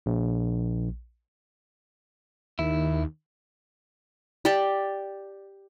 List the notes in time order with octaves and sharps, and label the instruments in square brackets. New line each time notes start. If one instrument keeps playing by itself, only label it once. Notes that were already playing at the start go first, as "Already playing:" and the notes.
[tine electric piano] A#1
[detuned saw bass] D#2 [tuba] D#3 [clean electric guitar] E4
[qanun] G4 D5 G5 A5